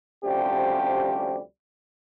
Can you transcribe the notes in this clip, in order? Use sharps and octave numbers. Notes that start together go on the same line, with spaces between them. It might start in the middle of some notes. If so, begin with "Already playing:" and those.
D2 C3 F3 G3 C#4 G4